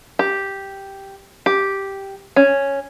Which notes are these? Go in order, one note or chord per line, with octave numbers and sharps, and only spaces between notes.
G4
G4
C#4